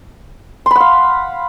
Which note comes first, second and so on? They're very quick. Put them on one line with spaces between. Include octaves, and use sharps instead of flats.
C6 B5 F#5 F5